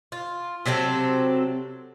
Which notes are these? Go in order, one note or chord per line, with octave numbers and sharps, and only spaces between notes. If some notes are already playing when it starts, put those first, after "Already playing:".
F4
C3 F#3 C4 A4